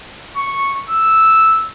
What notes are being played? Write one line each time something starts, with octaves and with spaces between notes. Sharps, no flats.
C#6
E6